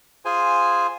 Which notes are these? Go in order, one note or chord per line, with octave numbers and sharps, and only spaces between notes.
F4 G#4 C5 G#5